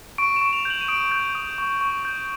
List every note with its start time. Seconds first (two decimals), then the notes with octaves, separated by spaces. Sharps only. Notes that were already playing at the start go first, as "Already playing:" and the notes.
0.18 C#6 D7
0.36 E7
0.42 C#6
0.53 F7
0.65 G6 F#7
0.81 D#7
0.88 D#6 D7
1.11 G6
1.35 D#6
1.58 C#6
1.81 C#6
2.05 G6